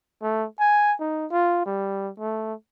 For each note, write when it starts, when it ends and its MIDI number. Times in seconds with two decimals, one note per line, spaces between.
0.23 0.45 57
0.60 0.94 80
1.00 1.26 63
1.31 1.62 65
1.66 2.10 55
2.19 2.54 57